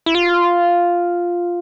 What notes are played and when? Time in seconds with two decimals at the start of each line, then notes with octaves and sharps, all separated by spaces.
0.06 E4
0.15 F4